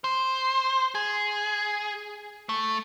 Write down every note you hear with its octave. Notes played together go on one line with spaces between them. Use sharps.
C5
G#4
A3